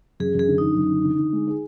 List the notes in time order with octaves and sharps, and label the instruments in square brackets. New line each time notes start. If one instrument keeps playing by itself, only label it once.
[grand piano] F#2 [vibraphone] G#4
[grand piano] F#2 [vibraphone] G#4
[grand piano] D3
[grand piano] F#2 [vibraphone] D#4
[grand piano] F#2
D3
D3
D3
G#3
G#4